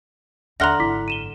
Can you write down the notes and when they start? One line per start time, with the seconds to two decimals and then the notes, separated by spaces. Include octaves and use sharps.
0.60 D#2 D3 E5 F#5 A#5 C6 F6 A#6
0.80 G#1 F#2 E4 D6 B6
1.08 D#7 E7 G7